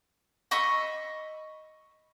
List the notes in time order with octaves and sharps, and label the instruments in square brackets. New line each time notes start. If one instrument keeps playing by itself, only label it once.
[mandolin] D#5 B5 C#6 E6